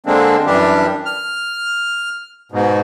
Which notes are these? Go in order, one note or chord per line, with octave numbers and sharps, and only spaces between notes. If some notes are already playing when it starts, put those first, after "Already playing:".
D3 G#3 A#3 C4 D4
F#2 E3 G3 D4 G4
F6
G#2 B2